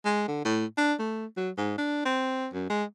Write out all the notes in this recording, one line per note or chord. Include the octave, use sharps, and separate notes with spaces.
G#3
D3
A2
D4
A3
F#3
G#2
D4
C4
F#2
G#3